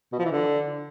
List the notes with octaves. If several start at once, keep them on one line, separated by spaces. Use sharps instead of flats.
B2
F3
E3
D3